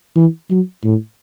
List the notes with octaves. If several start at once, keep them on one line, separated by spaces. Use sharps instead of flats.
E3
F#3
A2